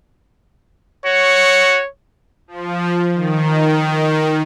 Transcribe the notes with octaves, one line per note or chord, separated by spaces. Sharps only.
F#4 C#5
F3
D#3